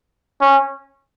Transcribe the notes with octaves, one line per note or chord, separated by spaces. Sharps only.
C#4